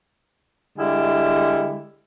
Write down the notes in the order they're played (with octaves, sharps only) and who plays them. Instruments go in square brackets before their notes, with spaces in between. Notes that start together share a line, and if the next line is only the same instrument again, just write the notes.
[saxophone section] D3 G3 G#3 E4